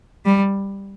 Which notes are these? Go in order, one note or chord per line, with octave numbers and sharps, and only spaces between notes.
G3